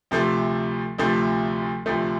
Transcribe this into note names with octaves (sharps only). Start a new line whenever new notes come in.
D2 C3 F3 A3
D2 C3 F3 A3
D2 C3 F3 A3